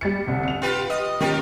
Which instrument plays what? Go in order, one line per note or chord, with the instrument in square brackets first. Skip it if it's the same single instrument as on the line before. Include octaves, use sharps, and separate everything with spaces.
[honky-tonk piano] G3 A6 C#7
G1 C2
C#7 F7
[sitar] F4 G4 B4
D#5
[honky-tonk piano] D#3 C#4 [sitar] F4 G4 A#4